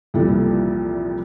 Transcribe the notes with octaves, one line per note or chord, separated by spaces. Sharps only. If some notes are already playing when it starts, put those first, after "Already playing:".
C2 F2 A#2 E3 G3 A4